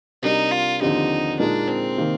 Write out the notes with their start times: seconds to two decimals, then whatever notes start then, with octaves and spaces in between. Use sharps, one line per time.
0.22 C3 G3 D4 D#4 G4 A#4
0.51 F4
0.81 D#2 D3 F3 C4 D#4 G4
1.39 A#2 G#3 D4 D#4 A#4
1.68 C4
1.97 C3 D#3 A#3 D#4